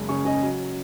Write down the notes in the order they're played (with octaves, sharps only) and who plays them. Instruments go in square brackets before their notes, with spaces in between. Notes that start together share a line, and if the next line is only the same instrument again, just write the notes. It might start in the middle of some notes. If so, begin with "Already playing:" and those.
Already playing: [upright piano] F#1 G#3
C#3 G#5 C#6
C#3 D#5 G#5
F#3